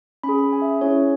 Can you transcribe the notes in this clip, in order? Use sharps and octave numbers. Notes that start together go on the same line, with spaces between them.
C#4 B5
G#4
B5
G#5
E5
C#4 E4 G#4 C#5